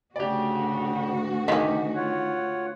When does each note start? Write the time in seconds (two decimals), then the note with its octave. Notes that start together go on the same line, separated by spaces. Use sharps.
0.16 D2 G#2 C#3 F#4 G4 D5
1.48 C3 D#3 C#4 G4 B6
1.95 F4 C#5 F#5